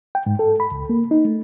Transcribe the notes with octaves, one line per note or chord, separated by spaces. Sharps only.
G5
G#2
A4
B5
C#2
A#3
D#4
A3